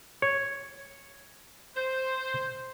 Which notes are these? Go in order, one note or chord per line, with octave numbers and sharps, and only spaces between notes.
C#5
C5